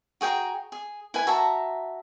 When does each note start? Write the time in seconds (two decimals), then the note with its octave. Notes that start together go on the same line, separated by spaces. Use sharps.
0.21 F#4 G#4 G5 A#5
0.72 G#4
1.14 E4 B4 G#5
1.27 F#4 E5 A5 A#5